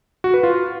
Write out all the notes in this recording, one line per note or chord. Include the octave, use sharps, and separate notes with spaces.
F#4
B4
F4